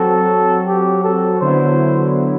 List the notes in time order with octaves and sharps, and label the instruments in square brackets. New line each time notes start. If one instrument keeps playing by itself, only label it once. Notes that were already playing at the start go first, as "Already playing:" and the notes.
Already playing: [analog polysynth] F#3 C4 F#4 [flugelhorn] A4
[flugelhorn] G4
A4
[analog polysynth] D3 F#3 B3 E4 [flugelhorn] C5